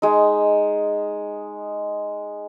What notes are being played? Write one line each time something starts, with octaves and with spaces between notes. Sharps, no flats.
G#3 D#4